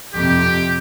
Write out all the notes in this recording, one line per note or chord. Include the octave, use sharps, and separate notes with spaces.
F2 C3 G4